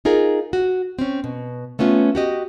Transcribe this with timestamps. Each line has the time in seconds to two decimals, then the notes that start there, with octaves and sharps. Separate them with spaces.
0.05 D#4 F4 G#4 A#4
0.53 F#4
0.99 C4 C#4
1.24 B2
1.79 A3 B3 C#4 F4
2.15 F#4 G4 D#5